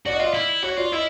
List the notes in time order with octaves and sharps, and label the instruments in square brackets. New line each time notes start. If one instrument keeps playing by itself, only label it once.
[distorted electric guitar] F#4 [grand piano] D5
[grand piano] D#5
[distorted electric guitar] F4 [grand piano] D5
[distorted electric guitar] E4
[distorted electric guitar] F#4 [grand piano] C#5
[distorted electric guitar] F4 [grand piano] D5
[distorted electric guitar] E4 [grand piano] D#5